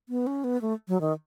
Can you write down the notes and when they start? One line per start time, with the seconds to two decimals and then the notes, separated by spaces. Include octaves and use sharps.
0.09 B3
0.27 C#4
0.44 B3
0.62 A3
0.88 F#3
1.01 D#3